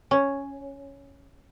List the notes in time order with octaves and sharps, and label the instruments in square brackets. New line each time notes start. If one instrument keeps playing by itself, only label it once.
[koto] C#4